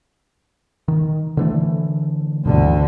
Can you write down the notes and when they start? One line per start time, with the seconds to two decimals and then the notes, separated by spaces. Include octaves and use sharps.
0.88 D#3
1.37 D3 E3 A3
2.45 D2 G2 B2 D3 E3